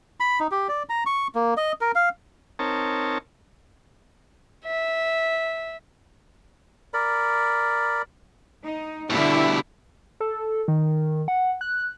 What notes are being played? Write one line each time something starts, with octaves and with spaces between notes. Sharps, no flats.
B5
D#4
G4
D5
A#5
C#6
A#3
D#5
A#4
F5
C4 D#4 A#4 C#5 A5
E5
A#4 D5 B5
D#4
G2 B2 D3 E4 G4
A4
D#3
F#5
F#6